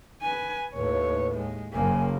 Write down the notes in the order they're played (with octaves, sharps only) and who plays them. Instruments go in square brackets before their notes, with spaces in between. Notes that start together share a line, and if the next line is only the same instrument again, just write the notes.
[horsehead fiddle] B4 G#5
[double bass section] D#2 A2 [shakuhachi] B4 [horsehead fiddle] C#5
[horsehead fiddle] G#3
[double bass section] F#1 C#3 [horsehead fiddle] A#3 [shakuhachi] G#5